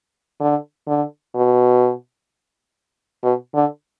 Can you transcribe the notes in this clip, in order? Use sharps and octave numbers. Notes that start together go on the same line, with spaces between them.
D3
D3
B2
B2
D3